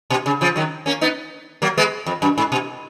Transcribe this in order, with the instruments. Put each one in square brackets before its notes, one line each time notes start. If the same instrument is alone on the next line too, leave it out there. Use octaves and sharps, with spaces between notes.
[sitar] B2
C#3
C#3 F3
D#3 F#3
A#3 C#4
B3 D#4
F#3 A#3
G#3 B3
F2
F#2
G#2
B2